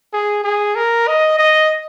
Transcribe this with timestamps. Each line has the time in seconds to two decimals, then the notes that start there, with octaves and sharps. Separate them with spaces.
0.13 G#4
0.44 G#4
0.75 A#4
1.08 D#5
1.38 D#5